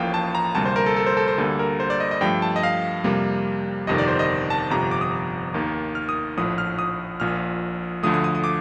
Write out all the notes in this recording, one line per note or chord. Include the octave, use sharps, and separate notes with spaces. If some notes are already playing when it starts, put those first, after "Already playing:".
Already playing: A1 A2 F3 A#3 F5 G5
A5
A#5
D2 C3 G3 A#3 A5
C5
A#4
A4
A4
C5
A4
C5
D2 D3 G3 A#3 A4
A#4
C5
D5
D#5
D#5
G2 F3 A3 G5
A5
D#5
F5
F2 C3 G3 A#3
G1 F2 C3 D#3 D#5
D5
C5
D#5
A5
G1 F2 C3 F3 A#5
D6
D#6
D#2 D#3 A#3
F6
D#6
A#1 A2 F3 D#6
F6
D#6
A#1 A#2 F3 F6
D2 D3 F3 A3 D#6
D#6
D#6
D#6
D6